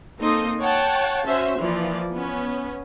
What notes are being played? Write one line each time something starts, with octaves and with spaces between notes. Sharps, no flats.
A#3 C4 D#4 A4 D#5 C6
C#5 F#5 G5 A5
C#4 F#4 C5 E5
E3 F3 A#3 D5
B3 C#4